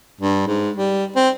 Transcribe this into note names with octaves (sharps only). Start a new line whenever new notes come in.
G2
G#2
G3
C4